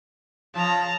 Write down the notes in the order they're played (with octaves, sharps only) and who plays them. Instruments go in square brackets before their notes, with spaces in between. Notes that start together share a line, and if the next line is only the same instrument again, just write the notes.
[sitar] C#3 F3 [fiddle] A5 A#5